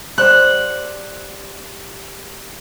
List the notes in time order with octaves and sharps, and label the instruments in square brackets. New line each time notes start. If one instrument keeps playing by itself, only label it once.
[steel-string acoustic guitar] G3 C5 F#5 [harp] F#6